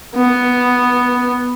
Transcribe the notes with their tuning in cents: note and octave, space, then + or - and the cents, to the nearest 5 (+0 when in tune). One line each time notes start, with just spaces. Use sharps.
B3 +0